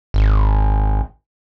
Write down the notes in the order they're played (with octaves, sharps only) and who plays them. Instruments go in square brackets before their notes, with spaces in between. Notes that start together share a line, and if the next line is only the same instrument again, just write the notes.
[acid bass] G#1